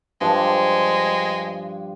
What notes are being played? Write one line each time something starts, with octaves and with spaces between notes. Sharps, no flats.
G2 F3 G#3